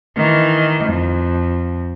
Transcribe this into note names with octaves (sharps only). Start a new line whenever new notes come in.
D#3 E3
F2